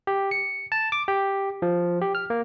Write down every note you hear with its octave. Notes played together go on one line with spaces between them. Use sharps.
G4
C#7
A5
D6
G4
F3
G4
F6
A#3